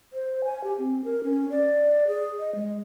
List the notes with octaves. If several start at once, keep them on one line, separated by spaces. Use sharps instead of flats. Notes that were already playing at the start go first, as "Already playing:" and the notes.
C5
G#5
G4
C4
A#4
C#4
D5
G#4
D#5
G#3